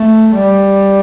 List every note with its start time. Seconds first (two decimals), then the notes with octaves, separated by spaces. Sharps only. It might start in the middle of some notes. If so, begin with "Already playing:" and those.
Already playing: A3
0.33 G3